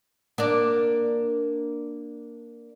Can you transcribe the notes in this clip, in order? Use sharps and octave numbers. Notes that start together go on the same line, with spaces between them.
A#3 D4 D5